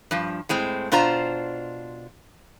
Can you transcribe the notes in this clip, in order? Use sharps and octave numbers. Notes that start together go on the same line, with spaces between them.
G2 F3
A2 G#3 C4
B2 D4 F4 C5 A#5